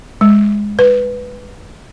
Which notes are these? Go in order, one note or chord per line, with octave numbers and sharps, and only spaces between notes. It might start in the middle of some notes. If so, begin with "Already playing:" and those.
G#3
B4